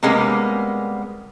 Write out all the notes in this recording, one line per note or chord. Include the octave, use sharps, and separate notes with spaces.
C3 G3 G#3 A#3 B3 C#4